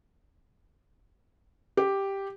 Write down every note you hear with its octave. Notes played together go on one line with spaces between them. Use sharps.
G4